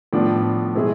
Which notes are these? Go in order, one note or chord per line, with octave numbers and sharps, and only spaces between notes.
A2 F3 B3 D4
B2 G#3 C4 E4 G#4